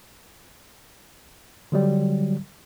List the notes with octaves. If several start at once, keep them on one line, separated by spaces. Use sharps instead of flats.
D3 F#3 G3